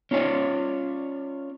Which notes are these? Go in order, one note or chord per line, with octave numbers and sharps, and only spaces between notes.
C#4 F4 C#5 D5